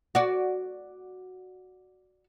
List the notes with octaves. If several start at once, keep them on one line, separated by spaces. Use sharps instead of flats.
F#4 D5